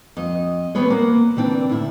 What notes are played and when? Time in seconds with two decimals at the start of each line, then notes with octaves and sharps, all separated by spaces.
0.17 F2 D#5
0.75 E3 G3 B3 C4 C#5
0.90 A#3 F#5
1.36 D3 E3 C4 D4
1.69 D2 A2 E4